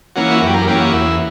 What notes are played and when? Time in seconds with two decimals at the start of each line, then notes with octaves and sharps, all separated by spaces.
0.16 E3 A#3 C#4 F#4
0.31 E4
0.39 F#4
0.42 F#2
0.47 G4
0.54 A#4
0.67 E3 A#3 C#4 G4
0.80 F#4
0.93 E2 E4